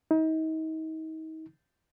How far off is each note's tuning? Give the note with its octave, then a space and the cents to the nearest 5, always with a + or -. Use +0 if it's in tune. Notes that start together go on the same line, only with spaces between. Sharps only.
D#4 +35